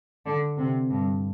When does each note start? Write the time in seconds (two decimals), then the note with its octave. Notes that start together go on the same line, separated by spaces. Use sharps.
0.25 D3
0.57 C3
0.89 G2